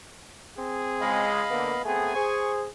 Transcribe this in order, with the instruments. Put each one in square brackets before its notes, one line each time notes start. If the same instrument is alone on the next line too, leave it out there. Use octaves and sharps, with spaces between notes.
[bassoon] C4 [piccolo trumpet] G#4
[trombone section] C#2 G#3 [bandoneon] D#5 F5 B5
[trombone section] D3 A#3 [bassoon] B3
[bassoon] A3 [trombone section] B3 C4 G#4 [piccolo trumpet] G#5
[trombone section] G#4 [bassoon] C5 [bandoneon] C#6